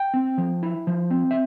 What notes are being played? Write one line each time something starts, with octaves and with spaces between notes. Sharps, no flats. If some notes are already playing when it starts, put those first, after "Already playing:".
Already playing: G5
C4
F3
E4
F3
C4
E5